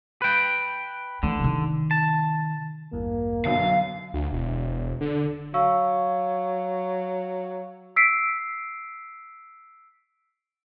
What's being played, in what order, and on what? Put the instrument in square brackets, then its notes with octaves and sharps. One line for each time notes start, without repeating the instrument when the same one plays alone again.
[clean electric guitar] B4 G5
[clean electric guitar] D3 [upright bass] E3 A3
[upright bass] C3 D#3
[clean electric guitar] A5
[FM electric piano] A1 E2 G2 [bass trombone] A#3
[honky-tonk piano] B1 F#2 B2 [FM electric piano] D3 F#3 [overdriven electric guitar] F5
[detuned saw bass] D2
E1
D3
[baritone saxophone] F#3 [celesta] F5 C#6 E6
[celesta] E6 B6 C7 D7